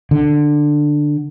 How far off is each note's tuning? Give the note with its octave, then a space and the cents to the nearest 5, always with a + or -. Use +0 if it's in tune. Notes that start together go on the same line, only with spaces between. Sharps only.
D3 +10